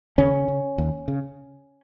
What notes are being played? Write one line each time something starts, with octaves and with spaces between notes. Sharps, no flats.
D#2 C#3 C#4
C#3
D#2
C#3